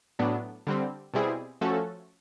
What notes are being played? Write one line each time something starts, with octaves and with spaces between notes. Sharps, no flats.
A2 F#3 B3 D4
D3 G3 C4
B2 G3 C4 E4 G#4
F3 A3 C#4 F#4 A4